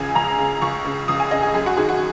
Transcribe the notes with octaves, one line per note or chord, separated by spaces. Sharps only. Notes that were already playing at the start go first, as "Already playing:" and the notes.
Already playing: C#2 C#3 G#5
C#2 A#5
C#3
C#2 C#6
C#3
C#2 D#6
G#5
C#3 D#5
G#4
F#2 G#4
F#4
D#3 G#4
F#4